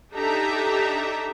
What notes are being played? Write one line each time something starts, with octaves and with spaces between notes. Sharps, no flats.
D4 D#4 G4 A4 E5 A#5